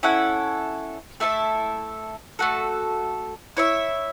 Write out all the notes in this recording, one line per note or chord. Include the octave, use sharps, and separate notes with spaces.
C#4 E4 A4 F#5
A3 E4 A4 E5
A3 F#4 A4
E4 C#5 E5